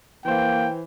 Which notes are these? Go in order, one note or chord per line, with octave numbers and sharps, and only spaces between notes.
E3 A#3 C5 G5